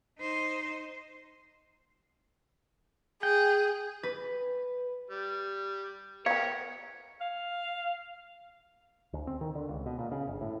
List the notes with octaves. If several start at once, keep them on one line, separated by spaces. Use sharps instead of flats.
D#4 C5
G#4 G5
B4
G3
B3 A#4 C#5 F5 G5
F5
D2
C4
D#3
D3
C#2
B2
A#2
C#3
G1
A2